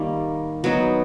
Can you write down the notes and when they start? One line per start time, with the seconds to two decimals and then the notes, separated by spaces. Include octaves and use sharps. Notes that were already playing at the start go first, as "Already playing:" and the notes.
Already playing: D#3 G3 A#3
0.64 F#3 B3 D#4